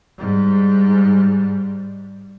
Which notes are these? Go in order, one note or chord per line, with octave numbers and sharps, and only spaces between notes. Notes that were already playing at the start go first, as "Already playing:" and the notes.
G#2 G3